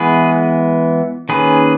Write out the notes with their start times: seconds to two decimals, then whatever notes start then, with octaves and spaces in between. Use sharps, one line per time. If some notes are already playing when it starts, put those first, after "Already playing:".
Already playing: E3 G#3 B3 G#4 B4
1.29 D#3 A#3 C#4 G#4 B4